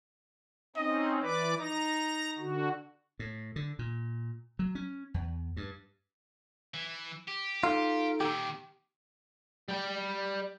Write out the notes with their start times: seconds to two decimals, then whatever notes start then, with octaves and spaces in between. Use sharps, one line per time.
0.76 C4 C#4 D#4 D#5
1.23 E3 B4 D5 D6
1.60 D#4 A#5 A#6
2.39 D3 F#4
3.19 A2
3.56 D3
3.79 A#2
4.59 F#3
4.75 C#4
5.14 E2
5.57 G2
6.74 E3
7.28 G4
7.64 D#4 F4 A4
8.21 A#2 D#3 G4
9.69 G3 G5